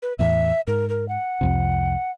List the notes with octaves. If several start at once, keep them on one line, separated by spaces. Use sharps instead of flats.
B4
E2 A2 E3 E5
G#2 A#4
A#4
F#5
C2 F2 C3